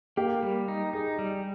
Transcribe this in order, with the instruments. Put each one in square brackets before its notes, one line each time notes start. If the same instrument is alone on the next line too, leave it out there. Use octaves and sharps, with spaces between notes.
[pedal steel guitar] A#3 [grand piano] G4
[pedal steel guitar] G3
D#4
[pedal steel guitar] D#4 [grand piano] G#4
[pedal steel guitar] G3